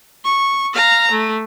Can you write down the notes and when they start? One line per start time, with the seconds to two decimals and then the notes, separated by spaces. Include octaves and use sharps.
0.25 C#6
0.74 F5 A#5
1.11 A3